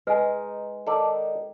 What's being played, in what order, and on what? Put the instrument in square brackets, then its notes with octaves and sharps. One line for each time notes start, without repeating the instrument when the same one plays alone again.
[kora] G#3 [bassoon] D#4 [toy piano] B4 G#5
[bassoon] D#3 [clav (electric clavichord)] A4 D5